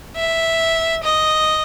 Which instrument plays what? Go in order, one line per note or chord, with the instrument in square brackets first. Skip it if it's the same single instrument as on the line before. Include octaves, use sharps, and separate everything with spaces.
[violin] E5
D#5